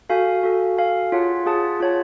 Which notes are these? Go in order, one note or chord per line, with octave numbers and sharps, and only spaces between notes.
F#4 A4 F5 G#5
F#4 A4 F5 G#5
F#4 A4 F5 G#5
F4 G#4 C#5 F#5 A5
F4 G#4 C#5 F#5 A5
F4 G#4 C#5 F#5 A5